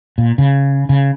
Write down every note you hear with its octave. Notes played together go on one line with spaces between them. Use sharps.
A#2
C#3
C#3